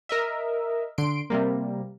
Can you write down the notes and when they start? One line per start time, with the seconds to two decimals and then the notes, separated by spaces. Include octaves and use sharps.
0.09 A#4 D#5 E5
0.98 D3 C6 D7
1.30 C3 G3 A#3